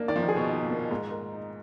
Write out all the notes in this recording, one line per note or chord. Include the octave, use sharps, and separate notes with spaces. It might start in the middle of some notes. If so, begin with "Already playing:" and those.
Already playing: A#3 D4 D#4
D#3 D5
F3
D#3
G#4
B2
D#4
A#2
A#3
G#2 G#3
A#4
D#4